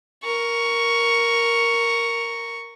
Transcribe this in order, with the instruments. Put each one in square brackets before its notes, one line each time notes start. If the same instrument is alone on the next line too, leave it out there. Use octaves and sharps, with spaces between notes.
[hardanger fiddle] A#4 C#6